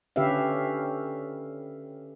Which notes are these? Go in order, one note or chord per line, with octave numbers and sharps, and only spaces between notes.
D3 C#4 G4 B4 E5 F5